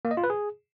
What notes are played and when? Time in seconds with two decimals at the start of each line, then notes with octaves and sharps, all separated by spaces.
0.05 A#3
0.11 D#5
0.17 F4
0.24 B4
0.30 G#4